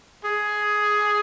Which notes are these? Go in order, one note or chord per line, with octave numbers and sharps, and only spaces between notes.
G#4